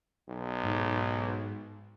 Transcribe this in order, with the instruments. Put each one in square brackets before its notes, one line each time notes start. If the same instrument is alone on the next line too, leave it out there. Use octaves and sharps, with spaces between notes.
[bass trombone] B1
[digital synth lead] G#2